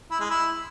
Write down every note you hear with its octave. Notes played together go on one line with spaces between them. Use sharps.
E4
G#3
E4